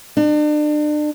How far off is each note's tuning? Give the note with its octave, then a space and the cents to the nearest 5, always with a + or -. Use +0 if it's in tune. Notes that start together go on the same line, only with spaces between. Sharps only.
D4 +35